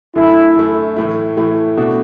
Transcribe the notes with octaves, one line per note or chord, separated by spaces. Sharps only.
F#2 D3 A3 E4
F#2 D3 A3
A2 E3 A3 E4
A2 E3 A3 E4
B2 A3 D4 F#4